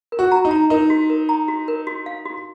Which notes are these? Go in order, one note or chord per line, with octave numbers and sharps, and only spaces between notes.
A#4
F#4
A#5
D#4
A#5
D#4 A#4
F#4
A#4
A#5
F#4
A#4
F#4
F5
F#4